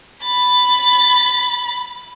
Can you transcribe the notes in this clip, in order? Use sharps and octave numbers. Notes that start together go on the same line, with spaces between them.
B5 A6